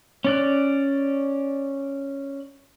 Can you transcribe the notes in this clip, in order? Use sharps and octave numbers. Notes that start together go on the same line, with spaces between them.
C#4 D5 F#6